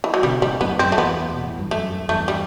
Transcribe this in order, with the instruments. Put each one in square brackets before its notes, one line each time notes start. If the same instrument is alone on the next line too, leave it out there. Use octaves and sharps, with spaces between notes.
[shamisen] E3
F#3
[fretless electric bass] B2 D3 [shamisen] G3
[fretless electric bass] A2 C3 [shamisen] G3
[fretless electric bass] F#2 A2 [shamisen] B3
[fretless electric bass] F#2 [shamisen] C4
[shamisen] A3
[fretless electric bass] E2 [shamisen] B3
[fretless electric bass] B2
A2
G2
[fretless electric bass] F#2 [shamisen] A3
[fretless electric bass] F#2
[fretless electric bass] E2 G2 [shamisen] A3
[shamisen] G3